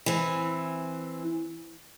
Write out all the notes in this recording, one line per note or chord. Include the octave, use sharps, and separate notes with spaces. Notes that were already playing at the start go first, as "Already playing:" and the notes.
E3 C4